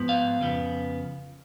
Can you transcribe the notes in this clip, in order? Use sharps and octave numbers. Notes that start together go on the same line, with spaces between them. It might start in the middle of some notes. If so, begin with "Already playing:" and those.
Already playing: G#2 F3 B3
F5
F2 C#3 F3 B3